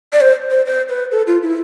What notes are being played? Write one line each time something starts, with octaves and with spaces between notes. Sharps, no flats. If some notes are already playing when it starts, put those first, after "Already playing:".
D5
C5
C5
C5
B4
A4
F4
E4